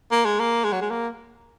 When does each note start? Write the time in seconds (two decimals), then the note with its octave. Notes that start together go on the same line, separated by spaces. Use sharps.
0.11 A#3
0.25 G#3
0.40 A#3
0.64 G#3
0.73 F#3
0.81 G#3
0.90 A#3